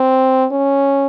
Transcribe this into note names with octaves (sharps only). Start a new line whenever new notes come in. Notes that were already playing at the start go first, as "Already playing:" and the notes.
Already playing: C4
C#4